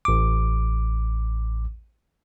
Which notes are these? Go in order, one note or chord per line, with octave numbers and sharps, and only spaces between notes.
A1 D6